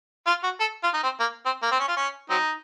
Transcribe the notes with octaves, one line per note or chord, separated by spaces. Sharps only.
F4
F#4
A4
F4
D#4
C4
A#3
C4
A#3
C4
C#4
F4
C#4
F#3 C4 D#4